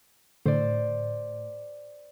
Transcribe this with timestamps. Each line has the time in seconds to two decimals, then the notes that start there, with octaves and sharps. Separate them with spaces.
0.46 A2 D3 C5 D5